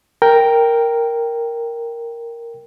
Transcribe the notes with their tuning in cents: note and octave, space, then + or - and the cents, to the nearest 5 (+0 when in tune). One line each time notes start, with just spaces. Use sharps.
A#4 +0 G5 +0